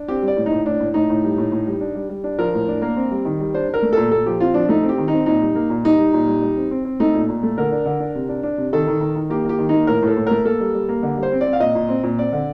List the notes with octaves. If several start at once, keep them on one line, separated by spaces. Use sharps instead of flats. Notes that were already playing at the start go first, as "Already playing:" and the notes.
Already playing: D4
C4 G4
G3
D5
A2
D#4
A2
A2 D4
A2
A2 D#4
A2
G3
A2
A2
G3
D4
G3
G3
D4
F3 A#4
A2
D4
A#3
C4
G3
D#3
G3
D4 C5
D4
A#4
A3
A#2 A4
A#2 A4
F3 G4
C4 F4
F3 D4
A3 D#4
C4
G4
D#3
D#4
C4
A#2 D#4
G3
A#3
A#2
G3 D#4
G3
A#2
G3
G3
C4
C4
C4
A3 D#4
A#2
A#2
A3
D3 A#4
D4
D3
D4
C3
D4
D4
C3
D#3 A4
D#3
D#3
D#3
A#3 G4
A#3 G4
D#3
A#3 D#4
A2 A#4
A2 A4
A2
A3 A#4
A#3 A4
G3
G3
A#3
D3
G3
C5
C4
D5
C4
F5
A#2 D#5
A#2
C4
A#2
C4 D5
D3